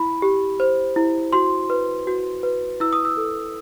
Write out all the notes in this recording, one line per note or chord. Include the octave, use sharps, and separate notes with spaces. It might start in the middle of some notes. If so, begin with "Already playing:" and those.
Already playing: E4 B5
G4
C5
E4
F#4 C6
B4
F#4
B4
E4 E6
D#6
E6
A4